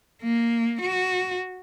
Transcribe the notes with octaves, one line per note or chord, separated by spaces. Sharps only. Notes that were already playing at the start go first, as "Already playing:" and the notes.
A#3
F#4